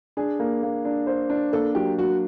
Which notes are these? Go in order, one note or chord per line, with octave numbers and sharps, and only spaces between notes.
D4 G#4
A#3
A#3
D4
C5
D4
A#3 A4
F#3 G4
F#3 F#4